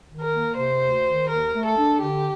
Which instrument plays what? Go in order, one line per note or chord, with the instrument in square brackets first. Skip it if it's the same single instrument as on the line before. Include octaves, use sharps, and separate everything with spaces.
[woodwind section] D#3
[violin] A#4
[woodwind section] A#3
[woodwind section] C3 [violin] C5
[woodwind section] D2
D#3
[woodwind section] D#2 [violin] A#4
[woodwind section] A3
[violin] A4
[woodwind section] D4
[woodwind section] D3 [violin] G4